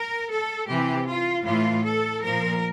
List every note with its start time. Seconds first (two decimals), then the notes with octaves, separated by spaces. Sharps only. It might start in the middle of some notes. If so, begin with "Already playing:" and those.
Already playing: A#4
0.30 A4
0.68 C3 E3 G4
1.07 F4
1.45 A2 E3 F4
1.84 A4
2.22 A#2 F3 A#4